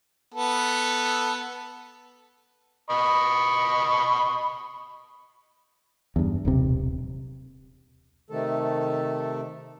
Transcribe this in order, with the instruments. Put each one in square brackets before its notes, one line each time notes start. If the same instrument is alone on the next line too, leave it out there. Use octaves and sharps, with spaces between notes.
[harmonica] B3 A4
D#5 B5 C#6
[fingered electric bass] E2 G2
D#1 B1 C3
[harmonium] C3 D#3 A3 A4